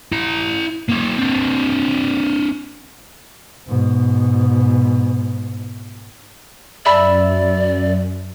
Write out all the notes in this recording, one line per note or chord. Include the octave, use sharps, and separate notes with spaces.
E4 A#5
A#3 C#4
C4 D4
G#2 B2
F#2 D5 E5 B5